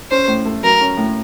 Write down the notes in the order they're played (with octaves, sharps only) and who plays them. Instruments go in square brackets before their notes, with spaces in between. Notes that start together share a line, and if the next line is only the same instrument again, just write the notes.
[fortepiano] C#4 [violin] C5
[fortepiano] A2
A3
[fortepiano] F#3 [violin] A#4
[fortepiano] C#4
A2